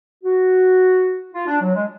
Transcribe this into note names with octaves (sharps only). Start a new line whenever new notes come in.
F#4
F4
D4
F#3
G#3